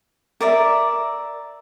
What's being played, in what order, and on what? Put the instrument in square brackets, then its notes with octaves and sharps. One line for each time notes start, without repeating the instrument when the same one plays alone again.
[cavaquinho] A#4 D5 E5